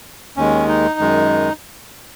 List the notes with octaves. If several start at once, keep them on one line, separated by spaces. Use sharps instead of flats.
D#2 D#3 G#3 C#4
D#4
F#2 D#3 G#3